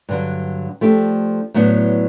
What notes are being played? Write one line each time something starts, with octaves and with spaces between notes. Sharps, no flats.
G2 D3 F#3
F3 A3 D4 G4
A2 F#3 B3 D4